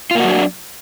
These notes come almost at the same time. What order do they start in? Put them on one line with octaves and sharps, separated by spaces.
F4 A#3 F#4 F#3 D4